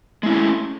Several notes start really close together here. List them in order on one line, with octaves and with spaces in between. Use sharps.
G#3 E4 C#4 A3